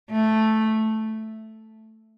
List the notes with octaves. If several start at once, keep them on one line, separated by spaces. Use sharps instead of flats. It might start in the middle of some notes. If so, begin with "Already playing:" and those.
A3